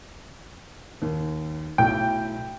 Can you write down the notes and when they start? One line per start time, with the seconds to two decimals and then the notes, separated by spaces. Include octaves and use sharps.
1.02 D#2
1.78 B1 A2 G5